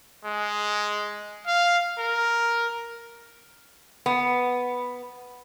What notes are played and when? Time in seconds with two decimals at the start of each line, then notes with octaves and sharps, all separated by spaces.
0.25 G#3
1.47 F5
1.98 A#4
4.06 B3